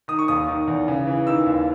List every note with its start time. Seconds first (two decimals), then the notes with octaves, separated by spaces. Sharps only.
0.08 D#3 D#6
0.19 C#6
0.28 D#2 D#6
0.48 D#3
0.67 E2
0.88 C#3
1.07 E3
1.27 D#3 E6
1.46 D#2